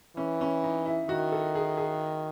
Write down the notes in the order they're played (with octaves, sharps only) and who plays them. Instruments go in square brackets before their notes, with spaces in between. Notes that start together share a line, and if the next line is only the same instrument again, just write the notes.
[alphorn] E3 [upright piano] C#4
[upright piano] C#4
D#4
E4
[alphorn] D#3 [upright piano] F#4
[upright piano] A4
G#4
G#4